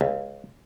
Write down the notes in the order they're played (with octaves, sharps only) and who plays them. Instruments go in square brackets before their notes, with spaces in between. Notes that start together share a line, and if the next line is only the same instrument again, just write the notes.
[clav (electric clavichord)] C#2